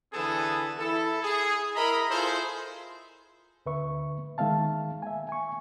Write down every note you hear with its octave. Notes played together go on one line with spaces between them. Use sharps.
D3 E3 B3 G#4 A4
E4 A4
G#4
E4 A#4 D#5 A#5 B5
E4 F4 G#4 A4 C5
D2 D3 B4 E5 C#6
D#3 G#3 E5 F5 A5
E5 G#5
G#5 C#6